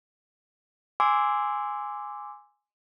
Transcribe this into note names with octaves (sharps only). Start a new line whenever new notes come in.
G#5 C6 D6 E6